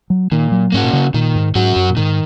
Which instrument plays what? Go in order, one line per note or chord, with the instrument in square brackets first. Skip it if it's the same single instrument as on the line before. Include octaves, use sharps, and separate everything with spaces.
[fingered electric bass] F#3
[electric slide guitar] A#2 [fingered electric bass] D#3
[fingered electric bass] F#3
[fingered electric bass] G#2 [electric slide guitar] A#3 C#4 F#4
[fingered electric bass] A#2
C#3
[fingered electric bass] A#2 [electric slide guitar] D#3
[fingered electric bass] G#2
[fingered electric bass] G#2 [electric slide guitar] F#3 C#4 F#4
[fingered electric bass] F#2
A#2
[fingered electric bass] G#2 [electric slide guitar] D#3